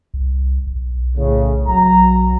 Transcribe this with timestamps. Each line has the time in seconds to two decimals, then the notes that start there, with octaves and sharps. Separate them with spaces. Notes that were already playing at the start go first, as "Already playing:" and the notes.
0.14 C2
0.67 B1
1.17 A2 C#3
1.68 B1 F#3 A#5